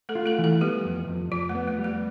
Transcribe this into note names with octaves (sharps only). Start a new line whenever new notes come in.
A3 A4
F4
A3 A4
E3
A3 A4
G3 B3 G4
F2
F2
F2 F3 F4
A3
B3
A3
G3
A3